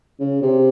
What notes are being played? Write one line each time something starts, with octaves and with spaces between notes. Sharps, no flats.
C#3
C3